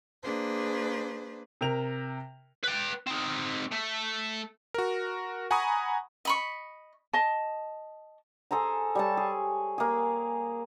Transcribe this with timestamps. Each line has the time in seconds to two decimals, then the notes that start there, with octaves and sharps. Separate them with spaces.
0.24 A#3 D4 G#4 B4 C5
1.61 C3 A#4 F7
2.64 B4 G5
3.07 C4 D#4
3.72 A3
4.74 F#4 A#4
5.51 F#5 G#5 A#5 B5 C#6 D#6
6.25 D#5 B5 C#6
7.13 D#5 A5
8.51 G#4 A4 C5 A#5
8.95 G3 C#5 A5
9.17 G#4
9.78 A#3 G#4